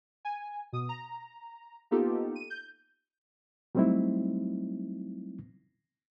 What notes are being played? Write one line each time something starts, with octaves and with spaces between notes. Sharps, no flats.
G#5
B2 D#6
A#5
A#3 B3 D#4 F4 G4 A4
D#7
G6
F#3 G3 A3 C4 D#4 E4